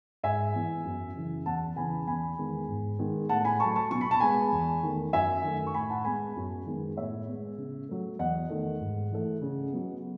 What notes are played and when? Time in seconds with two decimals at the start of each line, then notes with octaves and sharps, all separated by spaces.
0.23 G#2 E5 G#5
0.54 E3 B3
0.85 F#2
1.16 C#3 E3
1.46 E2 F#5 A5
1.76 C#3 E3 B3 G#5 B5
2.07 E2 G#5 B5
2.38 D#3 G#3 B3
2.68 G#2
2.99 D#3 G#3 B3
3.29 A2 F#5 A5
3.44 G#5 B5
3.60 F#3 A3 A5 C#6
3.76 A5 C#6
3.91 B2 C#6
4.01 B5
4.11 A5
4.20 G#3 B3 G#5 B5
4.52 E2
4.83 D#3 A3
5.13 F#2 E5 G#5
5.44 D#3 A3
5.67 C#6
5.74 A2 G#5 B5
5.89 F#5 A5
6.05 G#3 B3 G#5 B5
6.36 F#2
6.66 D#3 G#3 B3
6.97 A2 C#5 E5
7.28 G#3 B3
7.58 C#3
7.89 F#3 A3
8.19 E2 D#5 F#5
8.50 D#3 A3
8.81 G#2
9.11 E3 A3
9.42 C#3
9.72 F#3 B3